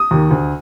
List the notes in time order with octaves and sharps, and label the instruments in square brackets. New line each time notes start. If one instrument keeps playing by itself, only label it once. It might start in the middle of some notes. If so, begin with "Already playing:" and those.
Already playing: [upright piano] D#6
D#2 D#3
D2